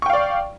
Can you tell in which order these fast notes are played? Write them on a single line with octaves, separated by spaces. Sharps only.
C#6 G5 F5 D5